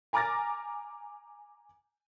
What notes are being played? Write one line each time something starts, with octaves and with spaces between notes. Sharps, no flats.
G#5 A#5 D6 F6 A6 A#6